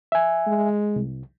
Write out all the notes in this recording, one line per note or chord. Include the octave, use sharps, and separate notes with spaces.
E5 G#5
G#3
C2